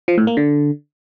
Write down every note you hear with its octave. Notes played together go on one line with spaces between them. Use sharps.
F3
A2
A#3
D3